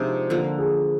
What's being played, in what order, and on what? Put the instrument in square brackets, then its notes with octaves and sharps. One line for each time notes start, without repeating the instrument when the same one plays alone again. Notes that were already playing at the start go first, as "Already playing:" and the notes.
Already playing: [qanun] C3 F3 G#3 D#4 [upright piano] D4
[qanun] D3 F3 A#3
[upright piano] G#4